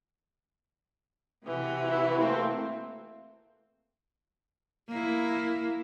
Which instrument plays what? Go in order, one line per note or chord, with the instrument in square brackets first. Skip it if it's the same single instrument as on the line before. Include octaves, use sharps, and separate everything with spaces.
[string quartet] C3 E3 F#4
[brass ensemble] E4
A3 A#3 C4
[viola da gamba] A#3 E4